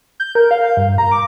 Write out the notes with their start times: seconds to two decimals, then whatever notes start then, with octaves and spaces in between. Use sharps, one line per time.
0.20 G6
0.35 A#4
0.51 F5
0.77 G2
0.98 A#5
1.11 D6